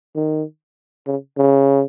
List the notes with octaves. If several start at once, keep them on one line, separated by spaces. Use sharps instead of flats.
D#3
C#3
C#3